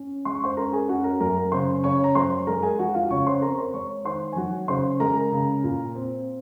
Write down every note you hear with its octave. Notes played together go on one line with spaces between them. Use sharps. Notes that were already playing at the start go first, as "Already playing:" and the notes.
Already playing: C#4
G#3 C6
C#6
C5 C6
C#4 A#4 A#5
G#4 G#5
C#4 F#4 F#5
A#4 A#5
F#2 A#4 A#5
C#3 C5 C6
C#3 C#5 C#6
A#5
F#2 C5 C6
G#3 A#4 A#5
G#4 G#5
F3 F#4 F#5
F4 F5
C#3 C#5 C#6
C5 C6
C4 A#4 A#5
C5 C6
G#3 C#5 C#6
D#3 C5 C6
G#5
F#3 F#4 F#5
C#3 C5 C6
G#3 A#4 A#5
C#3
A#2
C4